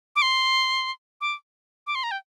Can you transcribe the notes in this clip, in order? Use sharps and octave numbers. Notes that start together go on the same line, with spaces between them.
D6
C6
D6
D6
C6
A#5
G5